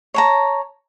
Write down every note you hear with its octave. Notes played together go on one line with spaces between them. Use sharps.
C#5 A5 A#5